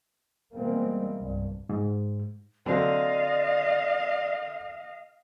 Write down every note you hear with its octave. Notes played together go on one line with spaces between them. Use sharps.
B2 E3 G3 G#3 A#3 C4
C2 G2
G#2
D3 F#3 C4 D5 D#5 F5